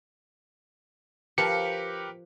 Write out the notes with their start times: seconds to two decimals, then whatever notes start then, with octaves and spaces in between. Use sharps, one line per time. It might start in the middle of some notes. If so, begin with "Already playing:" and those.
1.38 F3 G4 A#4 B4 C#7